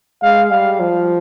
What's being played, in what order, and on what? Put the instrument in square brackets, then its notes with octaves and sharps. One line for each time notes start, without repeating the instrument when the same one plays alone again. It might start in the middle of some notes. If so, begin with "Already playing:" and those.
[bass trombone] G#3 [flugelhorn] F5
[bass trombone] G3 [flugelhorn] F5
[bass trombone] F3